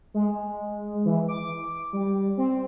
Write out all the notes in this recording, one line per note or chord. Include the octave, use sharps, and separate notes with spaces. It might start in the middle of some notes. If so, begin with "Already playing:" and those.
G#3
E3
D6
G3
C4